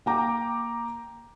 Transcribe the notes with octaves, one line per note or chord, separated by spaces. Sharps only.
A#3 G5 A#5 D6